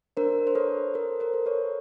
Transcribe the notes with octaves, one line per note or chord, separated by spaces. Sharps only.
D4 A#4 C5
C5
A4 B4 C#5
A4 A#4 C5
A#4 C5
A4
B4 C#5